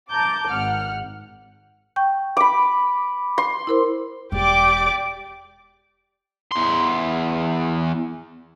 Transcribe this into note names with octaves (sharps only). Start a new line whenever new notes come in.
A5 A#5 D6 G6
G#1 F#5 F6
G5 C#6 G6
B5 D6
C6
E4 A#4 C5
E1 G4 D5 D6
E2 C6